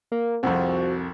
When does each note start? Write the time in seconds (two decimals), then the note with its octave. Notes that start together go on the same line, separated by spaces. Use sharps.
0.12 A#3
0.43 C2 F2 F3 F#4